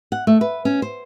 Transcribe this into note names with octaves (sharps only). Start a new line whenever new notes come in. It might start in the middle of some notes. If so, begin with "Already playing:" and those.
F#5
A3
B4
C#4
C5